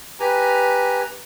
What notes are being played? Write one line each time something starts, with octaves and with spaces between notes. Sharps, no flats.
G4 B4 G#5 A#5